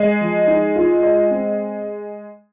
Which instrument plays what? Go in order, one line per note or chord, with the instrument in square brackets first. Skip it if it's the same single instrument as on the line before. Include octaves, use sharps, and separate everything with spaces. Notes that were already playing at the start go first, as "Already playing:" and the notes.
Already playing: [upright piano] G#3
[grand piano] F3
D#4
F4
D#5
C4